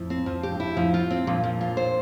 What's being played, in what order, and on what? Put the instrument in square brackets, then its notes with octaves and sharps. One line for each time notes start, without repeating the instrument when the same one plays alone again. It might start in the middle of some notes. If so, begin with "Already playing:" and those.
Already playing: [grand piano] F2 A2
[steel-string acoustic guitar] C4
[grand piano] F2 [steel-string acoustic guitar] F3
[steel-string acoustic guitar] G4
[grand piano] G2
[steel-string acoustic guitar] E4
[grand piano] F2 A2 [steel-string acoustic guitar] F3
[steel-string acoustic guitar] F4
C4
[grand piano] G2 A#2 [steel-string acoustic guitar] F3
[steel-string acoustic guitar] F3
F4
C5